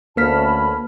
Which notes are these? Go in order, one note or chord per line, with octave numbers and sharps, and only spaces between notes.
D2 A#3 C#4 B4 A5 B5 F6 B6